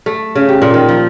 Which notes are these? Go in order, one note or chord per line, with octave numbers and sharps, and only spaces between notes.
A3
C#3
G4
A#2
D#3
F3